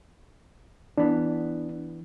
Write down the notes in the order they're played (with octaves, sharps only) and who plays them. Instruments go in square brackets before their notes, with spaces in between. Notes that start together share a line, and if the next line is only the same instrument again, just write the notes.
[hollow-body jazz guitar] E3 B3 [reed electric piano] D4